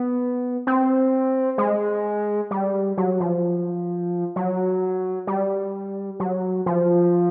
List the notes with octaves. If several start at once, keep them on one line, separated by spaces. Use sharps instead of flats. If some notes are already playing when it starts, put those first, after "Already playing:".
Already playing: B3
C4
G#3
G3
F#3
F3
F#3
G3
F#3
F3